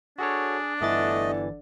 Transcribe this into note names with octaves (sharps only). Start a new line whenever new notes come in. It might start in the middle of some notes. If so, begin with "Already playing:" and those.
D4 F#4 G#4 A4 C#5
G1 D3 E3 A3 D#5 A6